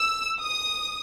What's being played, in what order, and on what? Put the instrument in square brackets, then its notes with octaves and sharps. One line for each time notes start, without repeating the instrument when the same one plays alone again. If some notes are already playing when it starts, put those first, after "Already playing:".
Already playing: [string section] E6
D#6